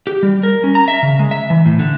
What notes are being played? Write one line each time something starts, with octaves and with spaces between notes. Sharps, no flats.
G4
G3
A#4
C#4
A#5
E5
C#3
G#3
E5
E3
A2
D3